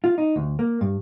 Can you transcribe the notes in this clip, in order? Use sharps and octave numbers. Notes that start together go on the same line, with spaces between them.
F4
D#4
D2
A#3
G2